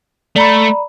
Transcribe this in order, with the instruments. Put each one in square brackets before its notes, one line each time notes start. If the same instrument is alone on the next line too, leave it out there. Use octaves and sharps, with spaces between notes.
[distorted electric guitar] A3 [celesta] D5 A#5 B5